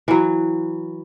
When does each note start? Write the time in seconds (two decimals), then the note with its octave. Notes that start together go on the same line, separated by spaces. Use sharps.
0.08 E3 F#3